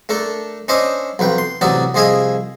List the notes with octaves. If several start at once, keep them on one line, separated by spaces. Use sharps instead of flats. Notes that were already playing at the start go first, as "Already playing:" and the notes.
A3 D4 A4 A#4
C#4 D4 C5 D#5 E5 D6
B1 F2 B4 G5
C6
A1 C3 F#3 D5 E5 D#6
C2 F3 G#4 D#5 E5 G#5